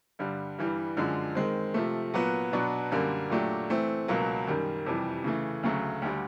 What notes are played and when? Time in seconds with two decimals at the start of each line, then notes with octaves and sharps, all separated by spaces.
0.19 G2 D3 G3
0.59 G2 E3 G3
0.97 F#2 D3 F3 G#3
1.35 D#3 G#3 C4
1.74 C3 F3 A3
2.14 A#2 F#3 B3
2.53 B2 F#3 B3 D4
2.91 F#2 D3 G3 A#3
3.30 A#2 F#3 A3 D4 G4
3.69 E3 A3 C4
4.08 C#2 B2 F#3 A#3
4.47 F#2 D#3 G3
4.86 F2 C3 E3 G3
5.24 C#3 E3 A3
5.63 D2 C#3 F#3 A3
6.02 D2 D3 G3